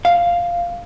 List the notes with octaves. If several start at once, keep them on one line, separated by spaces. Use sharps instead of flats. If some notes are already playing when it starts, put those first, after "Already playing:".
F5